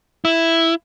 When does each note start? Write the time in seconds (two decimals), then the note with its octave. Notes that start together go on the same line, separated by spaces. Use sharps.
0.25 E4